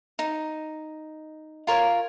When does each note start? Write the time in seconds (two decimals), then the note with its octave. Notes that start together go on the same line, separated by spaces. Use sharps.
0.19 D#4
1.67 F4 A#4 C#5